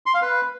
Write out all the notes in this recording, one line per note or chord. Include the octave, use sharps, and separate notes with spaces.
C6
F5
B4